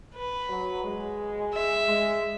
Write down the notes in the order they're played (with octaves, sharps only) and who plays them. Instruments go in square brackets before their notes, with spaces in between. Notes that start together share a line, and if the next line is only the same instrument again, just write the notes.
[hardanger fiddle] B4
[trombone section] F#3
G#3
[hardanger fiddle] E5
[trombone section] G#3